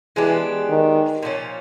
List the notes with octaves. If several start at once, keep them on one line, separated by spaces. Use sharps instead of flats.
E3 G#3 B3 D4 G4
D#3
A#2 F3 A#3 C#4